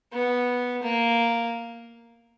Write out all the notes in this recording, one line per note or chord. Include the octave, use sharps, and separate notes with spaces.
B3
A#3